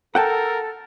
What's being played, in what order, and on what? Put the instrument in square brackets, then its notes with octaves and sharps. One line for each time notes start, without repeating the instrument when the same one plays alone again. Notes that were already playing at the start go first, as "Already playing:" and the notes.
[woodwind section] A4 [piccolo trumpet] A#4 [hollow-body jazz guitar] F#5 G5 A5